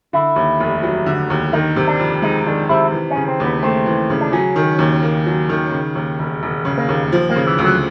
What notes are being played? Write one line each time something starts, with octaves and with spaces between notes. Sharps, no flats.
D3 E4
D#2
F1
F#3
D3
D#2
D#3 D#4
C3
D4
F2
G#3 D#4
D#3 D4
C3 E4
E3
C#4
C#3
C4
D#2 B3
A3 C4
E3
C#3
D4
F#3 C#4
D#3
D#2
A#3
F#3
D#3
C#3
D#2
E1
E1
C#3
A#3
D#2
F3
A#3
C#3
E3
D2
F#3